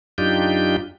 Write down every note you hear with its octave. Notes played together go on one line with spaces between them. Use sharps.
F#2 D4 D#4 F4 G4 G6